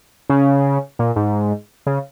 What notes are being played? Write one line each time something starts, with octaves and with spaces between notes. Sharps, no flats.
C#3
A#2
G#2
C#3